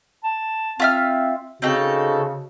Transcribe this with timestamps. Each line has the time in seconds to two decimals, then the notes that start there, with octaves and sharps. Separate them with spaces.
0.24 A5
0.80 C4 F4 E5 F6
1.62 C#3 C4 D#4 F#4 A4